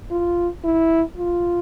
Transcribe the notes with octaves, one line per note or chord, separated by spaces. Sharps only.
F4
E4
F4